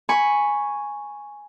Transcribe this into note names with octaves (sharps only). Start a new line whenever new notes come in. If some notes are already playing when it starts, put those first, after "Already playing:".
G#5 B5 C#6